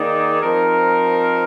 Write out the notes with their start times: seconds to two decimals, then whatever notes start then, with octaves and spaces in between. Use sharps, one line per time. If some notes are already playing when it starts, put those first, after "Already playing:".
Already playing: D#3 A#3 D#4 G#4 D5
0.41 F3 C4 D#4 A#4